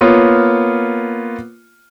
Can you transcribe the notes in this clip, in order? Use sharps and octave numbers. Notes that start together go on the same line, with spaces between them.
A#3 B3 F4 C#5